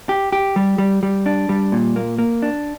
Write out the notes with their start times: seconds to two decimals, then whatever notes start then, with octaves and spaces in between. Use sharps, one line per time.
0.09 G4
0.33 G4
0.56 G3
0.78 G3
1.03 G3
1.26 D4
1.49 G3
1.72 A#2
1.96 A#3
2.19 A#3
2.42 D4